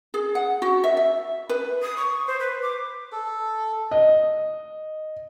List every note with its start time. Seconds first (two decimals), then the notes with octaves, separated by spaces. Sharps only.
0.14 G#4
0.35 F#5
0.62 F#4
0.84 E5
0.97 E5
1.49 B4
1.82 D#6
1.97 C#6
2.27 C5
2.40 B4
2.62 D6
3.12 A4
3.91 D#5